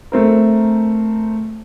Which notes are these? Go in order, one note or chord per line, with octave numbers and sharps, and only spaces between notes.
A3 C4 A#4